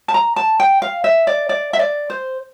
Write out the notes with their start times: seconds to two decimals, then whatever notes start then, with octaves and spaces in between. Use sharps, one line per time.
0.08 A5
0.14 A#5
0.36 A5
0.60 G5
0.82 F5
1.04 E5
1.27 D5
1.49 D5
1.73 E5
1.79 D5
2.10 C5